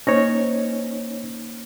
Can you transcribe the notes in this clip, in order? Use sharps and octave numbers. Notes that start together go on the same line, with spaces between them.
A#3 C#4 D#4 C5 C#5 A#6